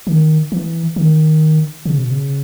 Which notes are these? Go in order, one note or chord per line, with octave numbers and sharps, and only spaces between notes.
D#3
E3
D#3
C#3
B2
C#3